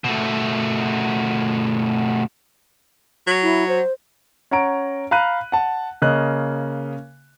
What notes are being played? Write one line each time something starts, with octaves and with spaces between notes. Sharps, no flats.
B2 A3
F#3
E4
C5
C#4 F#5 A#5 D7
F5 A#5 B5 F6 F#6 D#7
F#5 A5
C#3 A#3 D#5 F#6